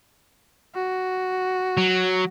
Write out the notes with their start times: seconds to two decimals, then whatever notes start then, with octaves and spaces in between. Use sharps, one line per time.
0.75 F#4
1.77 F#3